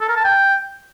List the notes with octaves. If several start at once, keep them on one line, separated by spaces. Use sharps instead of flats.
A4
A#4
A5
G5